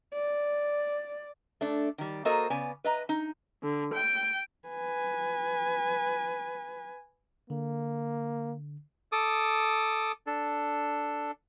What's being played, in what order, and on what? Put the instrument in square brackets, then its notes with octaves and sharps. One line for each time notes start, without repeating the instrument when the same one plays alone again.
[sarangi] D5
[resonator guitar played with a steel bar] A3 D4
D#3 G3
A#3 F#4 A4 A#4 C5 D#5
C#3 B3 D5 G#5
B4 D#5 A#5
D#4
[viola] D3
G5
[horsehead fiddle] B4 G#5
[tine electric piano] D3 [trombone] A#3
[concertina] A4 D6 D#6
D4 A4